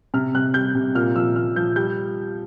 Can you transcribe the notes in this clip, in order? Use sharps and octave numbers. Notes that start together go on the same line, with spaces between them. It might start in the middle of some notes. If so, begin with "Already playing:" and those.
C3 F6
C3 F#6
G3 G6
C3
A#2 F6
F3 E6
A#2 F6
F3 G6
G3 G6